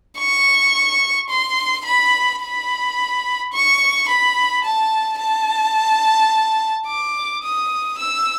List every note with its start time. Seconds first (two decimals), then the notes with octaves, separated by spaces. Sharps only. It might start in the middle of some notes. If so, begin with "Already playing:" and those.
0.19 C#6
1.30 C6
1.86 B5
2.42 B5
3.53 C#6
4.09 B5
4.64 A5
5.20 A5
6.87 D6
7.43 D#6
7.98 E6